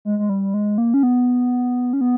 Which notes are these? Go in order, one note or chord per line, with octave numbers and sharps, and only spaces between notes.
G#3
G#3
G3
G#3
A#3
C#4
B3
C#4
B3